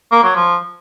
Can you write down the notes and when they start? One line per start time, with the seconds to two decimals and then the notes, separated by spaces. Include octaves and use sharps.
0.12 A#3
0.23 F#3
0.35 F3